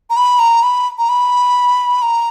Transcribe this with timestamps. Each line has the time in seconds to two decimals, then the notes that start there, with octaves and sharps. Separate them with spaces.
0.10 A#5
0.17 B5
0.39 A#5
0.63 B5
0.98 A#5
1.09 B5
2.02 A#5